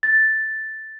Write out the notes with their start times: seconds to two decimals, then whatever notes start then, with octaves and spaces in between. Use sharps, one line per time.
0.03 A6